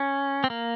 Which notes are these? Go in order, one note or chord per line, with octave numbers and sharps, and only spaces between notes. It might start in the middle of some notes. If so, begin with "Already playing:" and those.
Already playing: C#4
C4
A#3